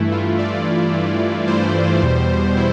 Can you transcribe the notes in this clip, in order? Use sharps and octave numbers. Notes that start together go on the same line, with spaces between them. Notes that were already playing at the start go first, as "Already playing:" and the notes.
Already playing: G2 E3 A3 E4
F4
G2 E3 A3 D5
G2 E3 A3
G2 E3 A3 C5
E2 B2 G3
E4